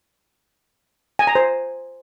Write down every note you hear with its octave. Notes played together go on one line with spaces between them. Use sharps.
G#5
A#5
C5